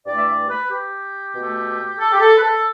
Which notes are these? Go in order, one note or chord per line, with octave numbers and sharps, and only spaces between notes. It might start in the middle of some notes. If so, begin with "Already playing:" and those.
G2 E3 A3 D5
E5
D5
B4
G4
B2 A3
A4
G4
A4
B4
A4